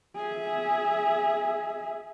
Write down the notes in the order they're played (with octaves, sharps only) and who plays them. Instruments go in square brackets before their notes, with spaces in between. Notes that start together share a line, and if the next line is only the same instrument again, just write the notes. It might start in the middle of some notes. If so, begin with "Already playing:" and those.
[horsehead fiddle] G#4 E5